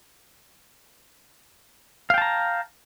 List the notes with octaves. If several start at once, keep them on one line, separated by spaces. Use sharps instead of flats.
F5 G5 A5 A#5